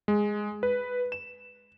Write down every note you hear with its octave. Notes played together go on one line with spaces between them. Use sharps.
G#3
B4
E7